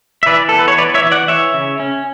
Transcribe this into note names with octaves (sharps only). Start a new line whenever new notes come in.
E5
E3 B4 D5
B3 A4
B4
C#5
E3 B4 D5
C#5 E5
E3
D5 F#5
E3 C#5 E5
C#3
C#4